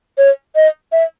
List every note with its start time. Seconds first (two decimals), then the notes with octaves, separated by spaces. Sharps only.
0.18 C#5
0.56 D#5
0.92 E5